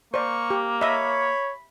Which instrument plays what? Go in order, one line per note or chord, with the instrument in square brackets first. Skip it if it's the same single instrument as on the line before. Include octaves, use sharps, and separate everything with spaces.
[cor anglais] A#3 [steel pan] C5 D5 [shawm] C#6
[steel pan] G4
[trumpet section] C#5 [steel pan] D#5 E5 [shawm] B5